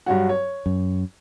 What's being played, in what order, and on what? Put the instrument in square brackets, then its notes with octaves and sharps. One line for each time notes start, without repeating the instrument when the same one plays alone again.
[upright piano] G2 F#3 F#4
C#5
[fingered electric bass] F#2